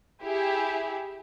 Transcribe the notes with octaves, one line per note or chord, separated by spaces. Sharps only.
E4 G4 G#4 E5